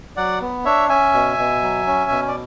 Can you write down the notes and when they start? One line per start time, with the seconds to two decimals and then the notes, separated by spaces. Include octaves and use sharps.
0.16 F#3 D5 F#5
0.41 B3
0.65 D4 C#5 E5
0.89 C#4 E5 G#5
1.13 B2
1.38 B2
1.62 F#3
1.87 C#4
2.11 B2
2.28 D5